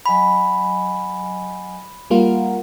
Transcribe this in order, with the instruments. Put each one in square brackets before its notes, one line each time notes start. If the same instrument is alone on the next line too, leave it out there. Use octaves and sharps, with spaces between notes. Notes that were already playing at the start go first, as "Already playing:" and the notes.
[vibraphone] F#3 D#5 G#5 [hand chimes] B5
[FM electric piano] G3 A#3 F4 [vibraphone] F5 F#5 A#5